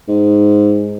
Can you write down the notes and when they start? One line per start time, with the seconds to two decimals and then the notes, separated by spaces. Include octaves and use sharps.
0.08 G#2